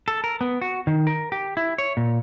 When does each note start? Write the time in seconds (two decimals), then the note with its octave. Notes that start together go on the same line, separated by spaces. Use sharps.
0.08 A4
0.24 A#4
0.41 B3
0.61 F#4
0.87 D#3
1.07 A#4
1.32 G4
1.57 E4
1.78 C#5
1.97 A#2